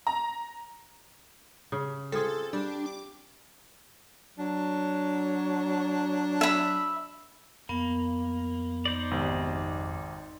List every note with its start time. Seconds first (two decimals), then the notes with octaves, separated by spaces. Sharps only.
0.07 A#5
1.72 C#3
2.12 C4 F4 G#4 A4
2.53 G3 D4
2.86 D6
4.38 F#3 D4
6.41 E5 B5
7.69 F2 A#3 B3
8.85 D#4 C5 D5
9.11 G#1 C3